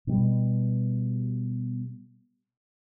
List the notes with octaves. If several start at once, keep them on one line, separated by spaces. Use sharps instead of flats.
B2 G3